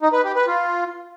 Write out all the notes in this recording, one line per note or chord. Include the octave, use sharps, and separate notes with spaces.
D#4
B4
G4
B4
F4